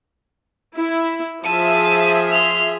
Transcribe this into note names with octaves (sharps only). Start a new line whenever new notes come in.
E4
F3 G#4 E5 A5 D#7
C6 F7